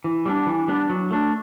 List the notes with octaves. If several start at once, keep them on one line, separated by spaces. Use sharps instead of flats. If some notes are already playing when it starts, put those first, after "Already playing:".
E3
G3 B3 D4
E3
G3 B3 D4
F#3
A3 D4